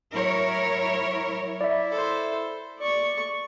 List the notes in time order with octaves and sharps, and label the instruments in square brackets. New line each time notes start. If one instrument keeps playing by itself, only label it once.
[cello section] F#3 E4 A#4 C#5
[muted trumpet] E4 [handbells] D5 E5
[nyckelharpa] A4 C5
D5 C#6